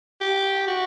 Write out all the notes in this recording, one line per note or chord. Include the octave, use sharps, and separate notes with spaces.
G4
F#4